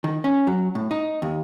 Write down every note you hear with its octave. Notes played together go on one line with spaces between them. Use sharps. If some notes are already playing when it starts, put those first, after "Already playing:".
D#3
C#4
F#3
A2
D#4
D#2